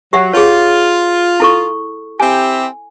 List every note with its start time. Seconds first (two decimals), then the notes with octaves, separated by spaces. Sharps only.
0.13 F#3 G4 E5 F#5
0.33 F4 G#4 C#5
1.40 E4 A4 C#6
2.20 C4 E4 G4 G#5